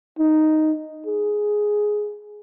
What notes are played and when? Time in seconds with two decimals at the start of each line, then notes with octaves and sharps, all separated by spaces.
0.19 D#4
1.07 G#4